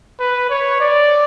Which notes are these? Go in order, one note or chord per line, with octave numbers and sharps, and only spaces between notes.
B4
C#5
D5